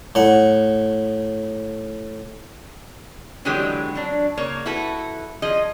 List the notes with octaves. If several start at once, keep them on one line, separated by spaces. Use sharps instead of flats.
A2 F#5
B2 D3 E3 F#3 G#3 G4
F#3 D4
C#3 A#3 C#5
E4 F#4 A4 B4
F3 G#4 D#5